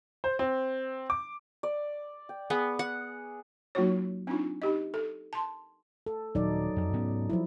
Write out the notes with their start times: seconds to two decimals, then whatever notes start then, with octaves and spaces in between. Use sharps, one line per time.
0.24 C5
0.39 C4
1.10 D6
1.63 D5
2.29 G5
2.50 B3 G#4
2.79 F#5
3.75 F#3 A#3 D#4 F4 F#4 C#5
4.27 C4 D4 D#4 F4
4.62 D#4 G4 D#5
4.94 A4
5.33 A5 C6
6.06 A4
6.35 D#1 F#3 D#4 D5
6.76 F2
6.93 G#2 B3 C#4
7.30 F3 F#3 E4